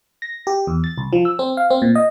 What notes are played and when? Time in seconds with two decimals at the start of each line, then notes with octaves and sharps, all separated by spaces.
0.22 A#6
0.47 G4
0.67 E2
0.84 A6
0.98 C2
1.13 F3
1.25 E6
1.39 C4
1.57 F5
1.70 C4
1.82 A#2
1.95 D#5